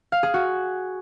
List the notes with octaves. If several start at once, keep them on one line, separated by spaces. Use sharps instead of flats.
F5
G#4
F#4